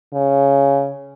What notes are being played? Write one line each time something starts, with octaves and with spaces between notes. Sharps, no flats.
C#3